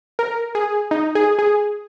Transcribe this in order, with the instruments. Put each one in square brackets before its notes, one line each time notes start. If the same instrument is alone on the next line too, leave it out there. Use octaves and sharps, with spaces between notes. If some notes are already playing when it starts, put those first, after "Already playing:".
[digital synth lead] A#4
G#4
D#4
G#4
G#4